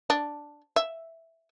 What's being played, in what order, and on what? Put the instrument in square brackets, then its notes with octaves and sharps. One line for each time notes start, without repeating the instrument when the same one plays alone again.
[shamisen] D4
E5